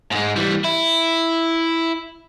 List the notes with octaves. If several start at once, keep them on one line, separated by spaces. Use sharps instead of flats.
G#2 G#3
E3 G3
E4